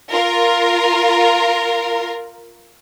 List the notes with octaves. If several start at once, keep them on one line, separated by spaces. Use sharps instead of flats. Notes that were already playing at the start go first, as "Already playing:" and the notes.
F4 A#4